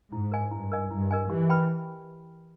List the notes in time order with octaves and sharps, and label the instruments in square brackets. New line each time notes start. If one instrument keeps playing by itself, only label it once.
[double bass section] G#2 [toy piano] E4
[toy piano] A#4 D#5 G#5
[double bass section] G2 [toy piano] E4
[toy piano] A#4 D#5 G#5
[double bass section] G2 [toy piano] E4
[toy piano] A#4 D#5 G#5
[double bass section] E3 [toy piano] G4
[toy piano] B4 G5 B5